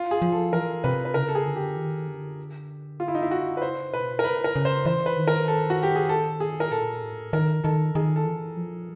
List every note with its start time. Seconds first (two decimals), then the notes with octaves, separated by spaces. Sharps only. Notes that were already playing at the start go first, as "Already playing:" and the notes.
Already playing: F4
0.11 G#4
0.22 F3
0.32 A4
0.53 E3 A#4
0.84 C3 B4
1.05 B4
1.14 C#3 A#4
1.28 A4
1.35 G#4
1.46 D3
1.56 G4
1.76 D#3
2.08 D3
3.00 F4
3.08 E4
3.15 D#4
3.22 E4
3.31 F#4
3.57 B4
3.62 C#3 C5
3.93 B2 B4
4.19 A#4
4.24 C#3 B4
4.44 A#4
4.56 C#3
4.65 C5
4.85 E3 C5
5.06 B4
5.17 D#3
5.28 A#4
5.48 A4
5.70 F#4
5.83 G4
5.96 G#4
6.09 A4
6.40 G#4
6.60 A#4
6.71 A#2 A4
7.02 A2
7.33 D#3 A#4
7.64 D#3 A4
7.95 D#3 G#4
8.16 A4
8.25 E3
8.57 F3